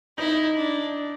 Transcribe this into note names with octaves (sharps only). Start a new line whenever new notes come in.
D#4 E4
D4